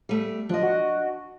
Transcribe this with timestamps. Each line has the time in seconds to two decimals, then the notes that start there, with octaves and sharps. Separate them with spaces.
0.09 G3 A3
0.49 F3 D4 D#5
0.63 F#4